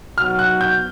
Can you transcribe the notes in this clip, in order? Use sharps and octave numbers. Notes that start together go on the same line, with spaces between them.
F#3 B3 D#4 F#4 F6
F#6
G6